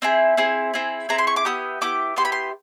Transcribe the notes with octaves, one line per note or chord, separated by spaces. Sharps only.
C4 E4 G#4
C4 E4 G#4
C4 E4 G#4
C4 E4 G#4 A#5
C6
C#6
D6
B3 E4 G4 D#6
B3 E4 G4 D6
B3 E4 G4 C6
B5
C6